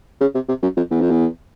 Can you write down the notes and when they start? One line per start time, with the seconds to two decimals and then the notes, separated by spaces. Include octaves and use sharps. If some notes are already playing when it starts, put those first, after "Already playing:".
0.21 C#3
0.35 C3
0.49 C3
0.62 F#2
0.77 F2
0.91 E2
1.01 F2
1.10 E2